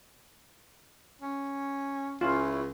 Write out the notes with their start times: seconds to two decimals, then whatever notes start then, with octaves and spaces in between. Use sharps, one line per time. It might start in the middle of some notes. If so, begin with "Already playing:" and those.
1.22 C#4
2.21 C#2 C#4 E4 F4